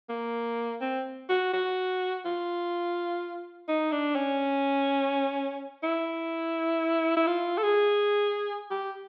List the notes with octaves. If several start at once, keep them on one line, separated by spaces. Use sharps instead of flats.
A#3
C4
F#4
F#4
F4
D#4
D4
C#4
E4
E4
F4
A4
G#4
G4